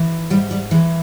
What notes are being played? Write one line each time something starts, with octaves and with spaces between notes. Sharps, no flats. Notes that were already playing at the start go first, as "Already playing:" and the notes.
Already playing: E3
G#2 G3
G3
E3 G#3